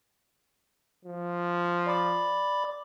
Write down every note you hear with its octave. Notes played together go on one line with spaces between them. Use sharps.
F3
D5 B5 D6